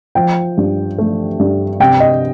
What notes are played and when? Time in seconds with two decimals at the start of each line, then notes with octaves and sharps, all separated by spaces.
0.15 F3 G5
0.57 G2
0.98 A3
1.39 G2
1.80 C3 G5
2.00 D#5